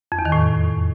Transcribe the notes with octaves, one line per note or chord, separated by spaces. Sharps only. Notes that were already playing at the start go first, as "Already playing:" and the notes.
F2
E2
D#3
A2